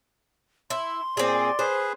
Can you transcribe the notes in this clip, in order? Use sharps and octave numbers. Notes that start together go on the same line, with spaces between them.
E4 C6
A#2 C4 G#4 D5
G#4 B4 C5